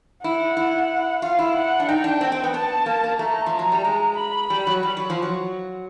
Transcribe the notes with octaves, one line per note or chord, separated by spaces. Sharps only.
E4 F#5
E4
F4 F5
E4
F#5
D4
D#4 G5
D4
C4
C4
B3
B3 A5
A#3
A#3
A3 A#5
F3
A#5
F#3
G3
G#3
B5
G3
F#3
G3
F#3
F3
F#3